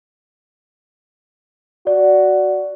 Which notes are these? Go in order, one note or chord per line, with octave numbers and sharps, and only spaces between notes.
F#4 D5